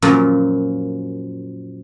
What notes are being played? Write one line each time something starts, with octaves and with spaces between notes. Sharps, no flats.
F#2 A#2 F3